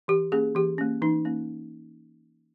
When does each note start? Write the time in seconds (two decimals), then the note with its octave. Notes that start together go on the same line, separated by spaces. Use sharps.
0.08 E3 G4
0.32 A#3 C#4 G#4
0.55 E3 G4
0.78 A#3 C#4
1.02 E3 D#4
1.25 A#3 C#4